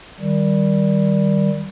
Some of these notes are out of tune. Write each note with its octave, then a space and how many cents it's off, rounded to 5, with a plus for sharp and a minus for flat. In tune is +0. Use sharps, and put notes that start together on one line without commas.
D#3 +0 G3 +0